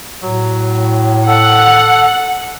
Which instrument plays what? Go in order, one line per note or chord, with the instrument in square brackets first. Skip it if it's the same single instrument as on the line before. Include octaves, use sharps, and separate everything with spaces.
[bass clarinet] A2 [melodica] F#3
[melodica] A4 [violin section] F#5